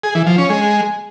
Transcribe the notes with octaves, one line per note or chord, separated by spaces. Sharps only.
G#4
E3
F3
C#4
G#3